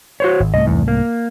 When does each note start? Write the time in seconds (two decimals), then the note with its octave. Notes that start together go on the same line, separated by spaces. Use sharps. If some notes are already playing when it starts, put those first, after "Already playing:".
0.20 F#4 C5 C#5
0.40 G#1
0.54 C2 G#2 A3 D#5
0.67 E2
0.88 A#3